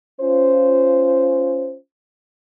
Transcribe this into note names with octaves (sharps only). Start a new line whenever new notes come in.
C#4 F4 C5